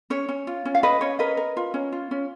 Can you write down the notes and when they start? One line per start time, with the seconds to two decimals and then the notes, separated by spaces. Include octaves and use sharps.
0.10 C#4 C#5
0.29 C#4
0.47 F4
0.65 C#4
0.75 F5
0.83 C#4 B4 D#5
1.01 C#4 C#5
1.19 A#4 B4 D#5
1.37 A#4
1.57 F4
1.74 C#4
1.92 F4
2.11 C#4